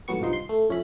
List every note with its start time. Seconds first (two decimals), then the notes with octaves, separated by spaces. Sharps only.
0.08 G#1 A2 F#3 B3 C#6
0.20 C2 G2 F3 D#4 C6
0.33 C6
0.49 A3
0.69 F2 C#4 E4 B5